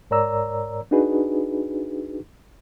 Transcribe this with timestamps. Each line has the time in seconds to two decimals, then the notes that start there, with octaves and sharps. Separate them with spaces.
0.11 G#2 A#4 C#5 D5 A#5 E6
0.91 D4 D#4 F#4 G#4 B4